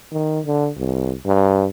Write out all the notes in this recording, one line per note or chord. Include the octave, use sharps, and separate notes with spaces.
D#3
D3
C2
G2